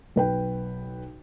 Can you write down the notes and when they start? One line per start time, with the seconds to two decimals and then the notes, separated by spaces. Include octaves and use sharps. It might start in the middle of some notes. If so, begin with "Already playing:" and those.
0.16 B1 B4 G5